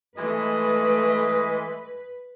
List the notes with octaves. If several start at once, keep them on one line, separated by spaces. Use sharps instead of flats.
E3 G#3 A3 B4 D#5